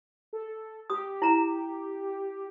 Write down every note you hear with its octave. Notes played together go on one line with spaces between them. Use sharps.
A4
G4 D#6
E4 A#5